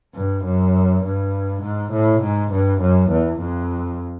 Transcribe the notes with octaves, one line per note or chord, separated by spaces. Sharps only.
G2
F#2
G2
G#2
A2
G#2
G2
F#2
E2
F2